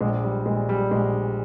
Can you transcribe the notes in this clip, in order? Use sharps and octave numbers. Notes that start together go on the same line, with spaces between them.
A#1 G#3
G3
A#2 G#3
G3
A#1 G#3